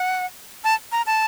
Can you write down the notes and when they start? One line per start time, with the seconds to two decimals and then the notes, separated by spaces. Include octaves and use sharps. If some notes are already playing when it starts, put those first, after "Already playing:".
Already playing: F#5
0.64 A5
0.92 A#5
1.06 A5